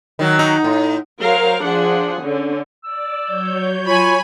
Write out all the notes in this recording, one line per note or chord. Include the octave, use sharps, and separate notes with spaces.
D#3 F#3
D#4
A2
F#3 A#4 C5 F5
F3 D4 G#4 F#5
D3 C#4
D5 E6
F#3 C#5 G6
F4 C#5 G#5 B5